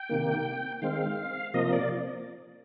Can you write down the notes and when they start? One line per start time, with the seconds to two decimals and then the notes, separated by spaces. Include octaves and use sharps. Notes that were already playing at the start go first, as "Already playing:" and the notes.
Already playing: G5
0.09 C3 D#3 A#3
0.82 D#3 G#3 C4 F5
1.54 C3 F3 A#3 D#5
1.73 D5